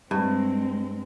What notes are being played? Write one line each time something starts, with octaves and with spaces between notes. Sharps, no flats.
G2 G#3 C4